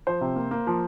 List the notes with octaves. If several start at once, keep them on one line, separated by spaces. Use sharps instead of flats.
F3 C5
C3
A#3
A#3
F3